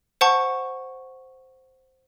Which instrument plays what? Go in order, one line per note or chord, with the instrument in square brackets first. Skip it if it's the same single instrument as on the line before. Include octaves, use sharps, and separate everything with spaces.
[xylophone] C5 F#5 A5 C#6